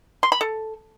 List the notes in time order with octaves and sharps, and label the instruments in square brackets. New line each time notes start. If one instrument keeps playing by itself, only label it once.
[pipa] C6
B5
A4